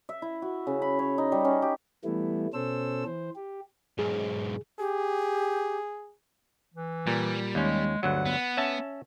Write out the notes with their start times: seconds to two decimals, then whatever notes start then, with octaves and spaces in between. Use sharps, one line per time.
0.09 E5
0.22 E4
0.42 F#4
0.67 C#3
0.82 B5
0.99 C#5
1.18 D#4
1.32 G3
1.45 C#4
1.62 G4
2.04 E3 G3 A3 B3 E4
2.54 B2 C#4 A4 C5 E6
3.05 E3 C5
3.36 G4
3.99 B1 G#2 G#4
4.79 G4 G#4
6.75 E3
7.07 A#2 G3
7.55 D#2 G#3 C#4
8.03 G1 D2 F#3 F#5
8.26 B3
8.57 C#4 E5 A5